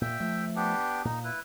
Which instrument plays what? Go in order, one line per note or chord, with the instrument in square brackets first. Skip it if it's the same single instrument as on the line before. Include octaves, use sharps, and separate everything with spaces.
[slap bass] A#2 [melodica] E5 G5
[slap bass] F3 A3
[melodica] B3 D4 G4
[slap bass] A#2 [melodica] D#4
[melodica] E4 B4